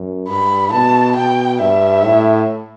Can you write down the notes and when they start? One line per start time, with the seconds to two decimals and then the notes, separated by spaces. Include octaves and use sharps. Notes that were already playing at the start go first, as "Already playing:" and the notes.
Already playing: F#2
0.29 G2 B5
0.72 B2 A5
1.16 B2 G5
1.60 G2 E5
2.04 A2